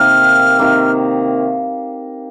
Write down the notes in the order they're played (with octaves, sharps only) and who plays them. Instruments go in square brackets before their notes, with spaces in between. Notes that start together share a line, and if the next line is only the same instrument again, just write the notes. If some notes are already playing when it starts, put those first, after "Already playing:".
Already playing: [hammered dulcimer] C3 D#3 A#3 [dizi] F6
[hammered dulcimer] C3 D#3 A#3